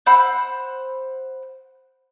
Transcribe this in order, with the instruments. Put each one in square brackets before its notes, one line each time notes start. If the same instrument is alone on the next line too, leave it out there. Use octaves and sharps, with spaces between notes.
[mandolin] C5 F#5 B5 E6